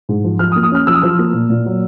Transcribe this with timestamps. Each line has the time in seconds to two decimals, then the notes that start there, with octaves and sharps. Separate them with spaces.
0.09 G#2
0.24 F3
0.39 F3 F6
0.52 D#6
0.56 A#3
0.63 D#6
0.72 C#4 F6
0.87 F3 E6
0.95 D#6
1.02 F3 E6
1.19 A#3
1.33 A#2
1.50 A#2
1.66 F#3